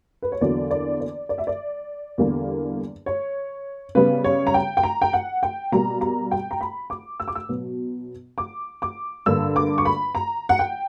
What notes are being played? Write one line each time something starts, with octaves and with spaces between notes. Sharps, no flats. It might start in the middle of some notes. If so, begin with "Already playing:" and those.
B4
C#5
E2 D3 F#3 A#3 D5
D5
D5
D5
E5
D5
E2 D3 G3 A#3
C#5
C#3 G3 B3 B4
C#5
A#5
G5
G5
A#5
G5
F#5
G5
B2 G3 A#3 A#5
A#5
G5
A#5
B5
D6
E6
D6
E6
B2 F#3 B3
D6
D6
G2 D3 A#3 E6
D6
C#6
B5
A#5
F#5
G5